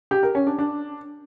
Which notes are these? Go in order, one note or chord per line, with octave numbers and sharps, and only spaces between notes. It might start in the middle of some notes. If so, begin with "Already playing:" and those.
G4
A#4
C#4
D4
D4